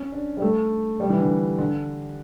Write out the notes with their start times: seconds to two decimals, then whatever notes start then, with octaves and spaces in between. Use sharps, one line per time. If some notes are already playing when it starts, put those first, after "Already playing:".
Already playing: C#4
0.12 D4
0.37 G3
0.42 A3
1.00 G3
1.10 E3
1.19 D3
1.58 D3